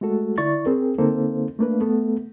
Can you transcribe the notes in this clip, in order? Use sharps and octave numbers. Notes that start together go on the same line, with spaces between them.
G#3 A3 F#4 A4
D3 E4 D5 C#6 A6
C4 G#4 A#4
D3 A#3 C4 D#4 A4 C5
A3 A#3 D4 B4
A3 B3 A4